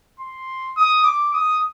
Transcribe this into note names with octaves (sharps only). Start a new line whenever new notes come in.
C6
D#6
D6
D#6